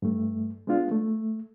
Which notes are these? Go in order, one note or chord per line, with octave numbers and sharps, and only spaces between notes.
G2 A3
G#3 B3 D4 F4
A3